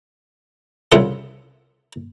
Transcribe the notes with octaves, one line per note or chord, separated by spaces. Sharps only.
C2 C#3 F4 E5 F#5